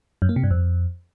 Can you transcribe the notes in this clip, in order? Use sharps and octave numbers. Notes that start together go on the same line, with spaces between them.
F#2
A#3
C3
G2
F2